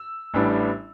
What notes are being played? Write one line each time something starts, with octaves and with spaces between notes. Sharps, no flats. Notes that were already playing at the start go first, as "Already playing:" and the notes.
Already playing: E6
A1 A2 G3 B3 D4